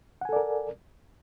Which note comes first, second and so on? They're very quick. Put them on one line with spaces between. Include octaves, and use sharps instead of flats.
F#5 G#5 A4 D5 A#4